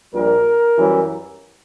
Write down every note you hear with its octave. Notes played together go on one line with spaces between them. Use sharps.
A#1 A#2 G3 A#4
F#2 E3 G3